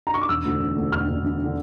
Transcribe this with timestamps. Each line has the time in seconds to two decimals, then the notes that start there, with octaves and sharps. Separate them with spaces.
0.07 A#5
0.14 C#6
0.22 D6
0.29 E1 E6
0.45 D2 D3
0.60 E1
0.76 D2 D3
0.92 E1 F6
1.08 D2 D3
1.24 E1
1.44 D3